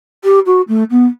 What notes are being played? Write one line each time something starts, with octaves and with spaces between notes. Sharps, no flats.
G4
F#4
A3
B3